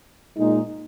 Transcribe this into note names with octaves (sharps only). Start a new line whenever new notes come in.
A#2 G#3 D#4